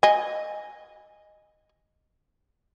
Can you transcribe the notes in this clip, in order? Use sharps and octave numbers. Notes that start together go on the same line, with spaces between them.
D#5 G#5